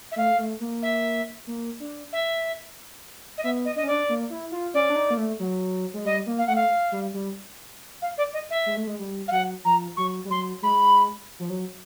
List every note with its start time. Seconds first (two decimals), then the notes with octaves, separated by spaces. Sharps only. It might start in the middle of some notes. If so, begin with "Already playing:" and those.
0.11 E5
0.16 A3 F5
0.38 A3
0.60 A#3
0.82 E5
1.47 A#3
1.80 D4
2.12 E5
3.37 D#5
3.43 B3 E5
3.65 D#5
3.76 D4 D#5
3.83 C#4
3.87 D4 D5
4.09 A#3
4.30 E4
4.52 F4
4.74 C#4 D5
4.90 D4
4.96 D#4
5.10 A#3
5.17 A3
5.40 F#3
5.94 G#3
6.05 G3 D#5
6.26 A#3
6.38 F5
6.47 A3 F#5
6.55 F5
6.92 G3
7.14 G3
8.01 F5
8.17 D5
8.33 D#5
8.50 E5
8.66 G#3
8.77 A3
8.87 G#3
8.99 G3
9.28 F5
9.31 F#3 F#5
9.64 F3 A#5
9.96 F#3 C#6
10.25 G3
10.30 F#3 C6
10.62 G#3 B5
11.39 F3
11.50 F#3